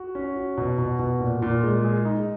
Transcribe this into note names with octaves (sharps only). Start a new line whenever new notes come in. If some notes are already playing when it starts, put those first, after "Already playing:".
Already playing: F#4
C#4
F#4
B2
B2
B2
A#2
A#2
G#3
G#4
D#4